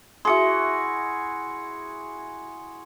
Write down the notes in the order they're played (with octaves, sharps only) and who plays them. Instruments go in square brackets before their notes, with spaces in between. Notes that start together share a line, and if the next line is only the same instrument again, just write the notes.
[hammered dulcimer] E4 F#4 G#4 [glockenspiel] C6 C#7